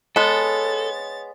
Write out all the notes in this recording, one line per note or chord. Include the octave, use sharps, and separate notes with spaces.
G#3 B3 A4 C#5 A6